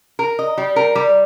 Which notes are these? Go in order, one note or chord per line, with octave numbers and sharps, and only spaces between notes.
A#4
D#5
G3
A#4
G3